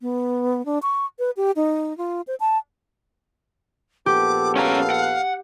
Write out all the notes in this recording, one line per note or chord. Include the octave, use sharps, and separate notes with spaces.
B3
D4
C#6
B4
G4
D#4
F4
C5
A5
A#1 B3 G4 A4 D6
C#4 F5 G#5 A#5
F#5